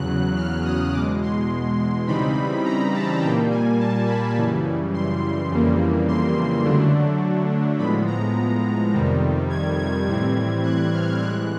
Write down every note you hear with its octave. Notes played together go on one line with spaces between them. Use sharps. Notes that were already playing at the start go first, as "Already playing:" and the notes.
Already playing: E2 C#3 F#3 F#6
F6
D#6
E2 B2 G#3 D6
C6
C#3 E3 G3 C4 D#4 B5
A#5
A5
A#2 G3 A#3 G5
G#5
A5
B5
F#2 C#3 E3 G3
C6
F2 C#3 E3 G3 A#3
C6
D3 F#3 A3 D4
A2 F3 G#3 B3 B5
A#5
F2 C3 D#3 G3
G#6
G#6
A2 E3 G3 C4 G#6
F#6
F6
A2 E3 G#3 F#6